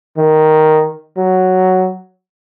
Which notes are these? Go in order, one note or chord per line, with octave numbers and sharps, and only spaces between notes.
D#3
F#3